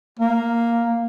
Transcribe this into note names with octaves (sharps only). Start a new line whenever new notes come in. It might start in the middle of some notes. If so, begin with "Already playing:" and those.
A#3